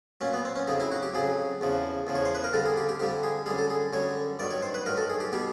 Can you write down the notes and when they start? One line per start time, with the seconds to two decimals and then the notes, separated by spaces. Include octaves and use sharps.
0.21 A#2 F#3 C#4
0.33 B3
0.45 C4
0.56 C#4
0.68 F2 C#3 F#3 D#4
0.80 E4
0.92 F#4
1.03 G4
1.14 F2 C#3 F#3 G#4
1.61 E2 C#3 F3
2.07 E2 C#3 F3
2.15 C#5
2.25 C5
2.35 B4
2.44 A#4
2.53 F2 D3 G3 A4
2.66 G#4
2.77 G4
2.89 G4
3.00 F2 D3 G3 G4
3.23 G#4
3.46 F#2 D3 G3 G#4
3.58 A4
3.70 G#4
3.93 F#2 D3 G3 C#5
4.39 G2 D#3 F#3 D5
4.51 C#5
4.62 C5
4.74 B4
4.86 G2 D#3 F#3 A#4
4.97 A4
5.10 G#4
5.20 G4
5.32 B2 G3 G4